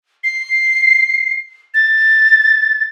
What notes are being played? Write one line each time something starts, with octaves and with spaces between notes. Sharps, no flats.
C7
A6